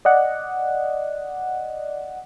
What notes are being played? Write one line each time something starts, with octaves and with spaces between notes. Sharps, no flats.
D5 D#5 F#5